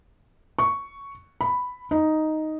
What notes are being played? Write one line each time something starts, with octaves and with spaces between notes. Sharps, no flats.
C#6
B5
D#4